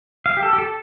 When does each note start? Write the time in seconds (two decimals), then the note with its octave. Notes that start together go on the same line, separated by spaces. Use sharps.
0.26 F5
0.37 G4
0.43 A4
0.53 G4
0.58 A4